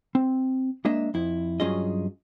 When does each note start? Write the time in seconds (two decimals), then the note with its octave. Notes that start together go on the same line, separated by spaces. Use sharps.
0.15 C4
0.85 G#3 A#3 D4 D#5 E5
1.14 F2 E4
1.60 G2 F#3 C#4 F4 G#4 D#5